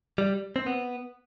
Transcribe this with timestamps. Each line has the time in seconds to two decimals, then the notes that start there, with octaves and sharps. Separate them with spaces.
0.18 G3
0.56 C4
0.66 B3